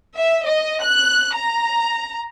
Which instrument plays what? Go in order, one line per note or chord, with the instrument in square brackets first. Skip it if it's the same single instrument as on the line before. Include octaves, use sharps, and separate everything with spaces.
[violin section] E5
D#5
F#6
A#5